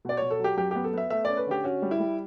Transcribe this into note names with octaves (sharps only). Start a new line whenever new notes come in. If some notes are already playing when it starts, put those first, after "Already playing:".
B2 D5
B2 C#5
A4
F#3 G4
F#2 G4
B3 G4
A4
B3 E5
A3 E5
C#4 D5
B4
D3 G4
C#4 F#4
G3
E4
G3